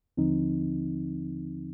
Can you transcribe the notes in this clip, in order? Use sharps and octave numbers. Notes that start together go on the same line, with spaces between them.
D#2 D3 F3 C4 D#4